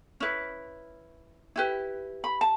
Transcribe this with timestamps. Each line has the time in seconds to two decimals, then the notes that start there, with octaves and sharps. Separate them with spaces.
0.20 C#4 E4 B4
1.56 E4 G4 B4
2.24 B5
2.41 A5